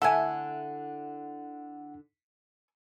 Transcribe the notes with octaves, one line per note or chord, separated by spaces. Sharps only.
D3 E4 A4 E5 F#5 G#5